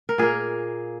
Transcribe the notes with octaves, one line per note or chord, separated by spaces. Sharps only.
A#4
A#2 A#3 G#4